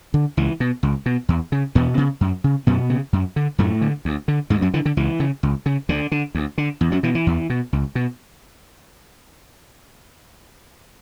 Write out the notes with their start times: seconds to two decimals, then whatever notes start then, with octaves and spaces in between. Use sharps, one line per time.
0.14 D3
0.37 C#2 E3
0.60 B2
0.83 C#2
1.06 B2
1.29 E2
1.52 C#3
1.75 E2 B2 B3
1.97 C#3
2.21 F#2
2.44 C#3
2.67 F#2 B2 B3
2.90 C#3
3.13 F#2
3.36 D3
3.58 F#2 A2 A3
3.81 D3
4.05 D2
4.28 D3
4.50 D2 G#2 G#3
4.62 F#2 F#3
4.74 D3 E3
4.85 D3
4.97 C#2 E3
5.20 C#3
5.43 C#2
5.66 C#3
5.89 D2 D3
6.12 D3
6.35 D2
6.58 D3
6.81 E2
6.92 F#2 F#3
7.03 B2 E3
7.15 E3
7.27 E2
7.50 B2
7.73 C#2
7.95 B2